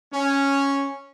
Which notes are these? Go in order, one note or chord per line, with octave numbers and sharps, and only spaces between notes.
C#4